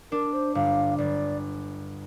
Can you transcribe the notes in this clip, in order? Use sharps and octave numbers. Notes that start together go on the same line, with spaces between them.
D4 A#4
C5
G1 F5
G1 D5